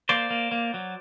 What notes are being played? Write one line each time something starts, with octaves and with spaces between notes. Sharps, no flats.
A#3 C5 D5
A#3
A#3
F#3